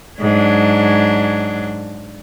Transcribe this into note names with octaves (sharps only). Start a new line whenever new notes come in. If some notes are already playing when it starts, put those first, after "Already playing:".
G#2 F#3 D4